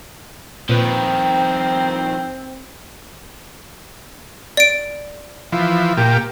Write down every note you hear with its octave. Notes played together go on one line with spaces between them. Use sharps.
A#2 D#3 F3 C4 B4 G5
D5 D7
E3 F3
A#2 G4